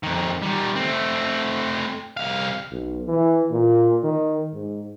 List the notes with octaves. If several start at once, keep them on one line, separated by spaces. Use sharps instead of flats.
F2 D#3
D#3 G3
A3 C4
C2 F5
B1
E3
A#2
D#3
G#2